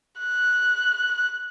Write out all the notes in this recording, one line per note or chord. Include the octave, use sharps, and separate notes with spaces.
F#6